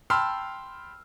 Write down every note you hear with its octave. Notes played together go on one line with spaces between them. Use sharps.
G5 A5 B5 C6 E6 F6